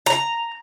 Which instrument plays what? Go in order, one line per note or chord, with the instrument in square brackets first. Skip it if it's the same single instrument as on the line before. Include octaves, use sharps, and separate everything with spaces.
[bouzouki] A#5